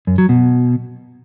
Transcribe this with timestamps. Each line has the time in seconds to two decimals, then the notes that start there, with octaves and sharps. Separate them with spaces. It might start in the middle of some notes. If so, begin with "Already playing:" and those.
0.07 F#2
0.18 F#3
0.29 B2